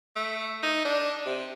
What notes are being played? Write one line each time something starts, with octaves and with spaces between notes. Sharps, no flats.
A3
D#4
D4
C3